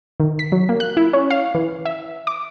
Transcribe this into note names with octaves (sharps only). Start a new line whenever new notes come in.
D#3
B6
F#3
A#3
F#6
E4
C#4
F5
E3
E5
D6